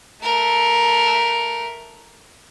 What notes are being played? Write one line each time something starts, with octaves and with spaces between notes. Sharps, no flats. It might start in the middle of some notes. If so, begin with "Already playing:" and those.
A3 A#4